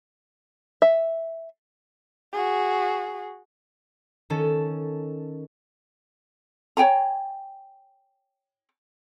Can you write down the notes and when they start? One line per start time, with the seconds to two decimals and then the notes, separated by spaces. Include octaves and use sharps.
0.82 E5
2.33 F#4 G#4
4.30 D#3 C#4 A4
6.77 C#5 G5 G#5 A#5